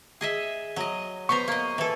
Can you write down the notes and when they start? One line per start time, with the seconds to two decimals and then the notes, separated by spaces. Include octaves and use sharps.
0.21 G#4 D#5 E5
0.76 F#3 D#5
1.29 B3 C5 A#5 C#6
1.48 A#3 D#5
1.78 E3 A4